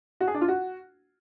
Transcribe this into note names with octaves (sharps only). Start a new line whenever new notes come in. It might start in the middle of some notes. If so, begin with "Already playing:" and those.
F#4
G#4
D4
F4
F#4